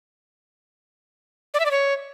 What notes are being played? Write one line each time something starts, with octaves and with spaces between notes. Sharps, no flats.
D5
E5
D5
C#5